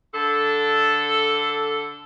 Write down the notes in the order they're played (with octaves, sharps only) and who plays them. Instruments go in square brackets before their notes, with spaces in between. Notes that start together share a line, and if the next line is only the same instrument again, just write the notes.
[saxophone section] D3 A4